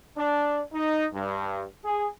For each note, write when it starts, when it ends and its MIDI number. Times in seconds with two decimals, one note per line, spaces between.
0.17 0.61 62
0.73 1.06 63
1.13 1.63 43
1.84 2.07 68